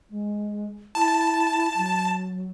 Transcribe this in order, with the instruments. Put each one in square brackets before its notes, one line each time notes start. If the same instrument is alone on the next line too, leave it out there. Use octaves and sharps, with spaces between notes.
[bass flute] G#3
[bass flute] E4 [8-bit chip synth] A5
[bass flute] F#3